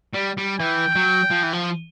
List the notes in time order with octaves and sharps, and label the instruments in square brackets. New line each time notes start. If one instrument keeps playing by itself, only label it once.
[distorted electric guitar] G3
G3
[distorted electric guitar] E3 [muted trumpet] G5
[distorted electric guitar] F#3
F3
E3
F3